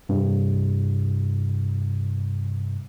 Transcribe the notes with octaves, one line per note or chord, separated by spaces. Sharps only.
G2 C3